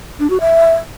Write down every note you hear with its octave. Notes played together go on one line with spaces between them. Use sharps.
D4
F#4
E5